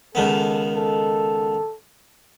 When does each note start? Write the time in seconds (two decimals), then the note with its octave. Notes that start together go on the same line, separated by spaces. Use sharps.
0.15 C#2 D#3 B3 A4
0.75 A4